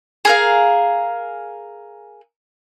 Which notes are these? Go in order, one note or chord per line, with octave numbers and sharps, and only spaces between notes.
G#4 A#4 F5